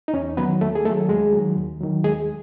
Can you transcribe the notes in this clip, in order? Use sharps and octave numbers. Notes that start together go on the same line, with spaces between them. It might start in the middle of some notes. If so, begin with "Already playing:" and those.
D#4
E2 C#4
D#3 F#3 B3 B4
D#2 A3 A4
G#4
D#3 F#3 A3 A4
D#2 G#3 G#4
D#3 F#3
D#2
D#3 F#3
D#2 G#3 G#4